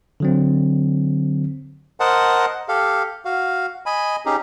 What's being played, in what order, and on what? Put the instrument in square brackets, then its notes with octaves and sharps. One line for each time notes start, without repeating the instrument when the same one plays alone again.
[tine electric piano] D3 F#3 C4
[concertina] A#4 C5 D#5 F#5 A5
G4 A4 F5
F#4 F5
D#5 G#5 B5
C#4 D#4 G4 G#4